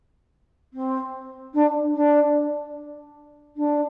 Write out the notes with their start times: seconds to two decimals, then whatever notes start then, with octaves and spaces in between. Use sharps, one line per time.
0.74 C4
1.54 D4
1.95 D4
3.57 D4